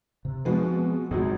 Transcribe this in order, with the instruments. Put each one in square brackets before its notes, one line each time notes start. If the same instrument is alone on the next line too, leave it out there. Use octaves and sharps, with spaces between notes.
[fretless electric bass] C3
[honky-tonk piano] B2 G#3 B3 [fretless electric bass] F3 C4
[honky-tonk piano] G#1 C#2 F#3 [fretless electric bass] F#2 B2 C4